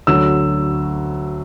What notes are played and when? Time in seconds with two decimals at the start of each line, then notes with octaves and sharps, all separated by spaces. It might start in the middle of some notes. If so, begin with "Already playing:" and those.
0.07 D2 D3 F#3 E6